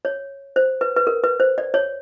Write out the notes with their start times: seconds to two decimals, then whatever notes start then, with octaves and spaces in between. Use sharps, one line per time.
0.05 C#5
0.56 C5
0.81 B4
0.96 B4
1.07 A#4
1.24 B4
1.40 C5
1.58 D5
1.74 C#5